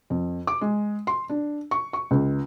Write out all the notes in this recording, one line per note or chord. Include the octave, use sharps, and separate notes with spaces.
F2
D6
G#3
C6
D4
C#6
C#6
C#2